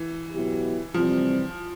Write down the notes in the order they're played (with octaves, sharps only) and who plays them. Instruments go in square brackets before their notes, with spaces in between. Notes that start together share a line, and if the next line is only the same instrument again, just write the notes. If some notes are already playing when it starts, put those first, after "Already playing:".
Already playing: [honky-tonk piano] E3
[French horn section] B2 F#3 B3 E4 G4
[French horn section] C3 E3 G3 C4 [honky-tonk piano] F3